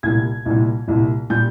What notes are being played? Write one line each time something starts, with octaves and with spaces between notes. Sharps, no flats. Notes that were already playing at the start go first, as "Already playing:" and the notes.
C2 A#2 G3 G#6
C2 A#2 G3
C2 A#2 G3
A#2 G3 G6